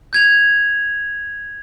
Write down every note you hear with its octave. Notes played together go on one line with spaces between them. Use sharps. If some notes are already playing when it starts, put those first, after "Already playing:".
G6 G#6 F7